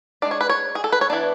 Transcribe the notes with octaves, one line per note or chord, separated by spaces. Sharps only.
G#3 D4 D5
C#5
B4
C#5
G#4
A4
B4
C#5
E3 B3 D4 D5